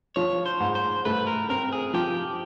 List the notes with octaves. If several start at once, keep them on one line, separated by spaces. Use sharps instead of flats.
F3 C#5
C5
G#2
C5
A3 B4
A#4
C4 A#4
G#4
F3 G4